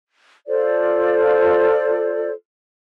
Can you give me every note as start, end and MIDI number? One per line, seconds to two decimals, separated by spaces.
0.48 2.32 65
0.48 2.32 69
0.48 2.32 72
0.48 2.32 74